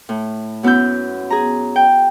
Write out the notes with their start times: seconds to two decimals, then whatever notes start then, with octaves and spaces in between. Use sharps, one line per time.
0.09 A2
0.63 F#2 B3 E4 E6 G6
1.30 G#4 A#5
1.76 G5